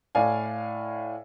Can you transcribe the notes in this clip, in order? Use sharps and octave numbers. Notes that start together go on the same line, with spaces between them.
A2 D5 F5 G#5